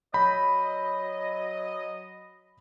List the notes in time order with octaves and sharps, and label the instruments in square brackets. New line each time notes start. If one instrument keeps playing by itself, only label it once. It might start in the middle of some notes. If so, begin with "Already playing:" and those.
[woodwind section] F#3 D#5 [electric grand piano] B5 G6